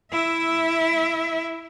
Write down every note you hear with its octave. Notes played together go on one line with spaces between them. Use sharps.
E4 E5